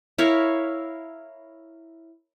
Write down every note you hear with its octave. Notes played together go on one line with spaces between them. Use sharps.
E4 A#4 C#5 F5